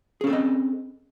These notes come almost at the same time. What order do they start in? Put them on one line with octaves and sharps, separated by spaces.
G#4 C#4 A4 C4 D#5